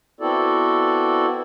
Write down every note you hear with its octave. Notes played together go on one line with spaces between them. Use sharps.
B3 C4 E4 F#4 A4 D5